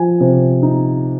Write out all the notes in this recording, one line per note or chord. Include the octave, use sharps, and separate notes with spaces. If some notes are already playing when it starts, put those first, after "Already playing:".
Already playing: F3 G#5
C3
D#4